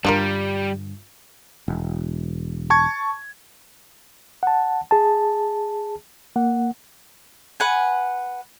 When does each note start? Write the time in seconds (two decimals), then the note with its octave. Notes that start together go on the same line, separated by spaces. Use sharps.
0.05 G2 D3 G3 D4 F4 A#4
1.68 E1
2.70 A5 C#6 G#6
4.43 F#5 A5
4.91 G#4 A5
6.36 A#3 F#5
7.60 B4 F#5 G#5